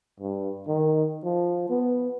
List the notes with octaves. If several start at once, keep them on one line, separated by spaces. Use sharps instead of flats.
G2
D#3
F3
B3